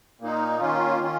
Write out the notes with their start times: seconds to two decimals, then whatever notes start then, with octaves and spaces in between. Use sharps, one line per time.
0.20 A#2 A#3 D#4
0.60 D#3 A#3 C#4 F4
1.00 D#3 C#4 F4